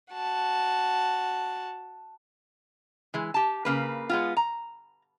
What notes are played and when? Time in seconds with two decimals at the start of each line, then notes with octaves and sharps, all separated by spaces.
0.13 F#4 A5
3.14 E3 G#3
3.34 G4 A5
3.65 C#3 A#3 B4
4.09 G#3 B3 F4
4.37 A#5